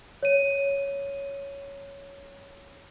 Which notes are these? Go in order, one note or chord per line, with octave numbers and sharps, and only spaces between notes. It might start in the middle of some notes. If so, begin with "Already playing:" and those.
C#5 D#7